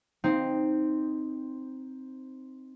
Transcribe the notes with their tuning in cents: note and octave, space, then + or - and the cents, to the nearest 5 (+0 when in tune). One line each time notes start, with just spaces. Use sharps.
C4 +0 D#4 +0